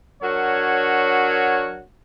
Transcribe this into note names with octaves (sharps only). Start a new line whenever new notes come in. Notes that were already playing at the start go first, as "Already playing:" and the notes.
F#3 D4 F#4 A#4 C#5